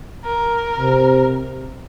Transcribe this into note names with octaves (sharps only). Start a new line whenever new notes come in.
A#4
C3